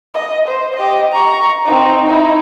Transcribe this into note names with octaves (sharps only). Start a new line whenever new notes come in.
D#5
C5
G4 D#5
A#5 C#6
C4 D#4
D#4 E4